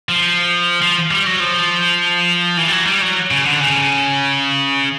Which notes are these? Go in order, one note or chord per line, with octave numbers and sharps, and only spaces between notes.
F3
F3
G3
F#3
F3
E3
G3
F#3
G3
F#3
C#3
D3
C#3